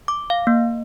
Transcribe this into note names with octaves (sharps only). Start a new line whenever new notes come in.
D6
F5
A#3